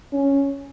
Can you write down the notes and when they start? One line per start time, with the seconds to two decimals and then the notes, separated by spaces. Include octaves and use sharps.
0.13 C#4